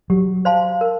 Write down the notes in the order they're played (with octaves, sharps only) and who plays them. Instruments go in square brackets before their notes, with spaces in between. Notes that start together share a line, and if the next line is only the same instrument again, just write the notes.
[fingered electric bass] F#3 [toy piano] G4
[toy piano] C5 F5 A5 C6
A#4